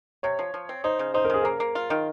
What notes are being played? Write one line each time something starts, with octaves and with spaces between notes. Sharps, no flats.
C3 C#5
F3
F3
C4
D#4 C5
C#3
D#4 C5
A#4
C#3 G#4
A#3 A#4
A#3
F4
D#3